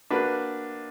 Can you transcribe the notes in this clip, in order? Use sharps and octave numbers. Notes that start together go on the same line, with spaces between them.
A#3 D4 F#4 B4